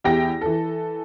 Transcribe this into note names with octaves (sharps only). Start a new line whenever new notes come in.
E2 E4 G4 G5 A#6
E3 A4